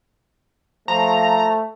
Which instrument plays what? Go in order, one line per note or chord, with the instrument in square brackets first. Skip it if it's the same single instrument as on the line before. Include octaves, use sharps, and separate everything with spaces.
[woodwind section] F3 [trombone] A3 [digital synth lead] A#5